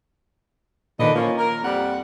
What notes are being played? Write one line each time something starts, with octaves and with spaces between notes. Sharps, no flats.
A#2 D3 D#3 B4 D#5
F3 A#3 C#4 F4
A#4
F2 G3 F#5